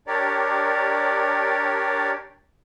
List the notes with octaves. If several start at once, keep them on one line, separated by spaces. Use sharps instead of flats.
D4 G4 A#4 C#5 D5